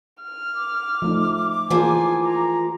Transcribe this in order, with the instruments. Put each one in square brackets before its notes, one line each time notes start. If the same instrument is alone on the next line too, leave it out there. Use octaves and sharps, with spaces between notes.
[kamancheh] F6
[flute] D6
[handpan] F3 A3 D#4
[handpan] E3 G#4 [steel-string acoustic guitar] F3 A#3 [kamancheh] G#5
[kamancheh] A#5